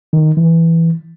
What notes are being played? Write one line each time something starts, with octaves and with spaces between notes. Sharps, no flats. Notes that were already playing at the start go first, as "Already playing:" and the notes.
D#3
E3